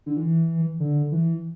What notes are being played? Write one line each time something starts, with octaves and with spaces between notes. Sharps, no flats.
D3
E3
D3
E3